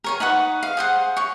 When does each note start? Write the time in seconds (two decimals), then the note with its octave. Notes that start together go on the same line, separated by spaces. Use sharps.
0.04 A#4 C#5 G#5
0.20 D#4 B4 F#5 C#6
0.63 F5
0.77 G#4 C5 F#5
1.17 C#5 C#6